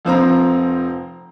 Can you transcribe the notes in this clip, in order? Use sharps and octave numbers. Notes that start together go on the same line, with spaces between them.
F1 F3 C4 A#5